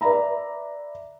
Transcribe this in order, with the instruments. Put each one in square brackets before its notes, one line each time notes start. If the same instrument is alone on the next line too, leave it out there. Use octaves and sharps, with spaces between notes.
[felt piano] B4 D5 E5 A#5 B5